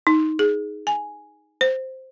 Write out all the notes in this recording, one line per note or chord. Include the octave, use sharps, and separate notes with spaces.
D#4
G#4
G#5
C5